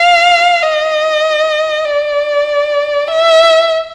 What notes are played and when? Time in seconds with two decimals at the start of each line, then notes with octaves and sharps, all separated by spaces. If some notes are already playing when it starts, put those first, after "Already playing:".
Already playing: F5
0.63 D#5
1.84 D5
3.08 E5